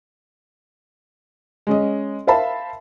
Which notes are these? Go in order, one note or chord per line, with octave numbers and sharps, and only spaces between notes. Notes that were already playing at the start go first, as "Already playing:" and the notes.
G#3 C#4 D#5
A#4 C5 E5 F5 A5 B5